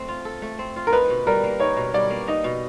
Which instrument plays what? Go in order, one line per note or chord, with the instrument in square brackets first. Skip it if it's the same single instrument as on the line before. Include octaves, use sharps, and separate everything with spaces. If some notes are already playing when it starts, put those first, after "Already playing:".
Already playing: [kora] A3 C4
F4
A4
A3
C4
F4
[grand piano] A#4
[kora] D#4 [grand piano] B4
[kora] B2
[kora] G3 [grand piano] A#4
[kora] A#3
[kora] D#4 [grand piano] C#5
[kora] B2
[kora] G3 [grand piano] D5
[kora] A#3
[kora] D#4 [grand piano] D#5
[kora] B2